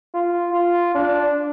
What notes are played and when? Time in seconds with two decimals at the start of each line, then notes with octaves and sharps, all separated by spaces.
0.14 F4
0.54 F4
0.95 D4